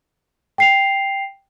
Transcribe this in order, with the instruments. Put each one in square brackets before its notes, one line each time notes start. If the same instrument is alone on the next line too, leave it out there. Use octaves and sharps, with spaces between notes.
[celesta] G5 C7 F7